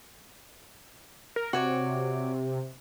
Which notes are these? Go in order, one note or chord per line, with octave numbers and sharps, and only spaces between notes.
A#4
C3 F#4 C#5 D5